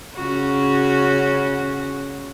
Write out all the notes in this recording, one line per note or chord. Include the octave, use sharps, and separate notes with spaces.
C#3 C#4 F#4